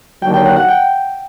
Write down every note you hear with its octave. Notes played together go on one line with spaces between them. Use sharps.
D#2 D3 F#3 G5
G5
F#5
F#5
G5